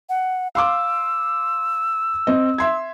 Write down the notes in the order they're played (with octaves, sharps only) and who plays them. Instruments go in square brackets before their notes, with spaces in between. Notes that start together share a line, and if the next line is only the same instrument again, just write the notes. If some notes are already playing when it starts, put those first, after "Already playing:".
[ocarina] F#5
[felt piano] F5 C6 D6 [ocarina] E6
[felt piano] C4 D#5
E5 C6 G#6